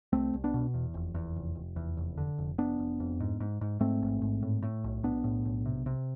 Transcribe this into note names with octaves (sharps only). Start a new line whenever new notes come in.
C2 A3 C4
C2
B3 D4
B2
E2
F1
E2
F1
F1
E2
F1
D3
F1
F1 B3 D4
F1
F2
G#2
G#2
G#2
G#2 A3 C4
A1
G#2
A2
A2
B1
B1 B3 D4
A2
B1
C3
C3